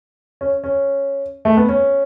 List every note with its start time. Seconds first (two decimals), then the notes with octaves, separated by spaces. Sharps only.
0.41 C#4
0.64 C#4
1.45 A3
1.57 B3
1.69 C#4